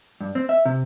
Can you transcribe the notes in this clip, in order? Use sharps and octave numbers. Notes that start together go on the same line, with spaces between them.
G2
C4
E5
C3